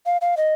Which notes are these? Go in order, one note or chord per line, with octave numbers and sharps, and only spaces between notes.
F5
F5
D#5